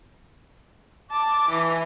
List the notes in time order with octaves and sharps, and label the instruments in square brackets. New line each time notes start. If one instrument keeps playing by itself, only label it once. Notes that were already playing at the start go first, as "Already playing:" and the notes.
[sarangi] A5 [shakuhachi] D6
[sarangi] E3